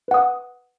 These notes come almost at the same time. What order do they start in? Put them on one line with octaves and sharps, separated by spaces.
B4 F#5 D#6